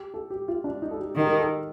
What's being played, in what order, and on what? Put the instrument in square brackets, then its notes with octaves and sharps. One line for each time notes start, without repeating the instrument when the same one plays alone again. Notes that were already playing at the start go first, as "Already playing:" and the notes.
Already playing: [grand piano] G4
A4
G4
F4
D4
D#4
A4
G4
[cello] D#3 [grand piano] G4
[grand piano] A#4
A4